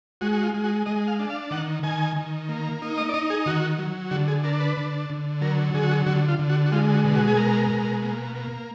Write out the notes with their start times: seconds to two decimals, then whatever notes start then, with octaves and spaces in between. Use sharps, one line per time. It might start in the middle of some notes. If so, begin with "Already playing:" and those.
0.21 G#3 F#4
0.33 F#4
0.43 F4
0.54 G#3
0.64 F#4
0.86 G#3 D#5
1.08 F5
1.19 D4
1.30 F5
1.51 D#3 F#5
1.83 D#3 G#5
2.16 D#3
2.49 A#3
2.82 D#4
2.98 D#5
3.09 D5
3.14 D#4 D#5
3.30 G#4
3.46 D#3 F#4
3.78 F#3
4.11 D3 F#4
4.28 G#4
4.43 D4 A#4
4.60 B4
4.77 D3
5.10 D3
5.41 F#3 A#4
5.74 D3 G#4
5.84 F#4
5.91 G#4
6.06 D3 F#4
6.28 F4
6.39 D3
6.50 F#4
6.66 F#4
6.72 G#3 F4
6.94 F#4
7.04 B2
7.15 F#4
7.28 G#4
7.37 G#3 A#4
7.70 B2
8.02 A#3
8.35 A#3